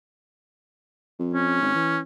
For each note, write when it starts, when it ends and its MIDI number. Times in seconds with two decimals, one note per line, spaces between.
1.19 1.56 41
1.33 2.00 61
1.61 1.74 32
1.75 2.00 52